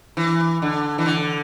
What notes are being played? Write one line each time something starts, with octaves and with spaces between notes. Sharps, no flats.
E3
D3
E3
D3